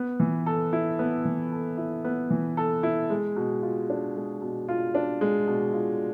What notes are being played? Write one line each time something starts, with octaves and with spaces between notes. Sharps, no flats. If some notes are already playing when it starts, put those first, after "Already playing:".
Already playing: B3
E3
A4
E4
B3
E3
A4
E4
B3
E3
A4
E4
G#3
B2
F4
D4
G#3
B2
F4
D4
G#3
B2
F4